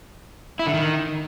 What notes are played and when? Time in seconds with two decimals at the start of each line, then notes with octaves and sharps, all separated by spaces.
0.59 E4
0.67 D3
0.74 D#3